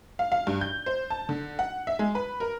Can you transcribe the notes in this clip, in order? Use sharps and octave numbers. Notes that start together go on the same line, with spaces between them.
F5
F5
G2
G6
C5
A5
D3
F#5
E5
G#3
B4
A#4